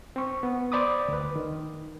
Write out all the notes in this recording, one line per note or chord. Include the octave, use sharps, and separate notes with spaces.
C4 C#6
B3
C5 D5 B5 D6 D#6
D2 B4
D#3